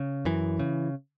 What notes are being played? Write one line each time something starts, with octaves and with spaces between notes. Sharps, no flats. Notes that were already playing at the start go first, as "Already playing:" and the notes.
Already playing: C#3
F#2 E3
C#3